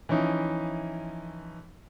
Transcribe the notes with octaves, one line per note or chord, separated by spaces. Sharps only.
E3 F3 C#4 D#4 E4